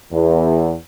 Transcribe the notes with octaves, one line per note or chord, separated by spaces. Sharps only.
E2